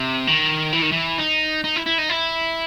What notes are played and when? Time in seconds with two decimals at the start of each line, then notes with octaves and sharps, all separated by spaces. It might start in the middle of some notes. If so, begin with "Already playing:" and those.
Already playing: C3
0.27 D#3
0.73 E3
0.82 D#3
0.92 E3
1.18 D#4
1.64 D#4
1.76 E4
1.86 E4
1.99 D#4
2.10 E4